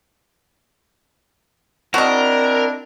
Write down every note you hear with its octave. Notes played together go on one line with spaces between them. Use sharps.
C4 D4 E4 F#4 A#4 D#5